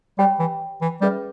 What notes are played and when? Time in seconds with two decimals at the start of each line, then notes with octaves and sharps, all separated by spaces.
0.19 G3 G4 C#5 G5 B5
0.39 E3
0.82 E3
1.02 G3 C#4 G#4 B4 E5